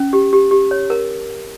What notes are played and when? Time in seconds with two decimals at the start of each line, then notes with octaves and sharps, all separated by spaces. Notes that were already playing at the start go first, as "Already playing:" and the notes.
Already playing: C#4
0.13 G4
0.33 G4
0.51 G4
0.71 C#5
0.90 A#4